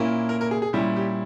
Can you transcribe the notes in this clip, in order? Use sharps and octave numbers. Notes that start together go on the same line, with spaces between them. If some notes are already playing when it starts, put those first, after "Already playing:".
Already playing: A#2 A#3 C#4 E4
A#4
A#4
G#4
G#4
A#2 G3 C#4 E4 G4
G4